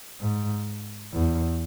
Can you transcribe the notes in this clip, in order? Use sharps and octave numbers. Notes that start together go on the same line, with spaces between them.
G#2
E2